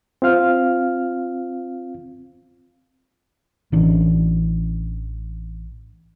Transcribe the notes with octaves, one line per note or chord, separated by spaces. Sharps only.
C4 F4 F5 F6
A1 E3 C#4 D4